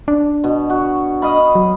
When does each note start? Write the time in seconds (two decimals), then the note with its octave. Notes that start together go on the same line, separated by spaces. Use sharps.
0.08 D4
0.44 B2
0.70 F#4
1.22 D#5 F5 B5
1.55 F#3